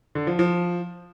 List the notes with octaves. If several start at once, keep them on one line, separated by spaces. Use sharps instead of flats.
D3
F3
F3